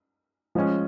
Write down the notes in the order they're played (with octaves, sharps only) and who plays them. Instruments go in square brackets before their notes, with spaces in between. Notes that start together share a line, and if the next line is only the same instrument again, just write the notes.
[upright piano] F3 G#3 C#4